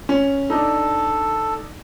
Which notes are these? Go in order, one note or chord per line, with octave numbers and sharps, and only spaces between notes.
C#4
D4 D#4 A4